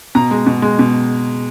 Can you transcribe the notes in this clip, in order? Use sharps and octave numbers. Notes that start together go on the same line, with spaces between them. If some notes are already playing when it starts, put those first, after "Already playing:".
B2 A#5
G#3
B2
G#3
B2